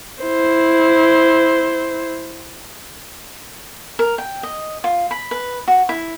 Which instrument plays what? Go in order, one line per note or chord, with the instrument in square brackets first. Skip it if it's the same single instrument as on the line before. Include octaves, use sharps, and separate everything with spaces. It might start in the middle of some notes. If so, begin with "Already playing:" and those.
[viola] E4 C5
[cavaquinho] A#4
G5
D#5
F4
B5
B4
F#4
E4